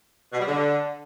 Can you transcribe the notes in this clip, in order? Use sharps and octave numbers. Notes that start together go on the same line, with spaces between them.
B2
G3
D3